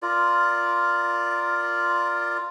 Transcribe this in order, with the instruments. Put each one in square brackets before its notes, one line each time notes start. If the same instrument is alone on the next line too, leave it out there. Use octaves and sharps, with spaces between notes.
[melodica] F4 A#4 D5